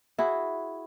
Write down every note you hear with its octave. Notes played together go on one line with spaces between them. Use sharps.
E4 F#4 G#4